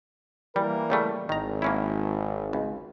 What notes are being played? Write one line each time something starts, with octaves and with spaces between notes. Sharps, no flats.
E3 G3 A#3 A#4
C#3 G3 A3
G#1 D#3 A#5
A#3 C#4 E4
C#2